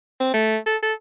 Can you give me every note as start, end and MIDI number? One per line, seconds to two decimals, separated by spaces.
0.21 0.32 60
0.34 0.57 57
0.67 0.76 69
0.83 0.93 69